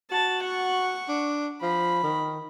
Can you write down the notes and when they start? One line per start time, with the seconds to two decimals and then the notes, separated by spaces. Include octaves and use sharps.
0.12 F#4 A5
0.43 F#5 C#6
1.09 D4
1.62 F3 B5
2.03 D#3